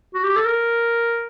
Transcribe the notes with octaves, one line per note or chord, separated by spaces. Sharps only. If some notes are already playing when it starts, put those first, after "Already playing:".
F#4
G4
A4
A#4